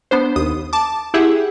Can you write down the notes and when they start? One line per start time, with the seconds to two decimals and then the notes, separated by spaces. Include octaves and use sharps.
0.11 B3 D4 C5
0.36 D#2 D#6
0.73 A5 D6
1.14 E4 G4 G#4 E5 F#5